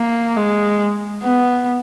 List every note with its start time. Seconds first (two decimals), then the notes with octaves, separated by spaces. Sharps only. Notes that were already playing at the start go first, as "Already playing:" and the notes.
Already playing: A#3
0.37 G#3
1.23 B3